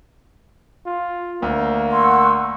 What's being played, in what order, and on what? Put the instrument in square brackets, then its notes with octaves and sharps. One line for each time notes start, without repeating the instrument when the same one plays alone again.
[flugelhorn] F4
[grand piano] D2 [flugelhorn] A#3
[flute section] F#5 C#6 E6 [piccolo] C6